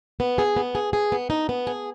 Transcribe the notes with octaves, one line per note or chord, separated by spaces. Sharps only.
B3
G#4
B3
G#4
G#4
B3
D#4
B3
G#4